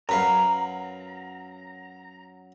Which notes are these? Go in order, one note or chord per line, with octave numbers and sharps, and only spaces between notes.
F#2 B4 F5 A#5